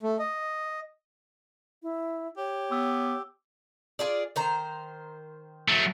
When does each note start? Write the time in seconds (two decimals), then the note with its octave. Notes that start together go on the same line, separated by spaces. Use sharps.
0.03 A3
0.19 D#5
1.83 E4
2.37 G4 C#5
2.71 B3 D6 E6
3.99 F4 G#4 D5
4.36 D#3 C5 A#5
5.68 F#3 A3